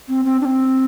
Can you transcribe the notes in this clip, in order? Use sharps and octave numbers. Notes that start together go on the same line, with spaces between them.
C4
C4
D4
C4